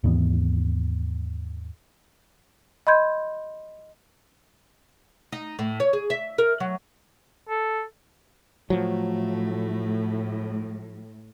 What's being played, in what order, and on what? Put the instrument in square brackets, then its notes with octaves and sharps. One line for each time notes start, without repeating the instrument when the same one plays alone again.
[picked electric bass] D#2 G#2 E3 B3
[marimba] D#5 B5 C6 G6 G#6
[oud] D#4
A2
C#5
G#4
E5
A#4
F#3
[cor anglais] A4
[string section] A2 [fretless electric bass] F3 F#3 [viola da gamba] A3